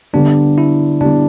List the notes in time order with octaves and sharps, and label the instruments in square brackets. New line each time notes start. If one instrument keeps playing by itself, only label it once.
[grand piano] D3 G3 B3 [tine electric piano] D4
[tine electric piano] E4
[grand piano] D3 G3 B3 [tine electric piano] D4